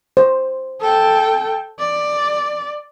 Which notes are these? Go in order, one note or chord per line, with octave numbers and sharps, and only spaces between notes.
C5
A4 G5
D5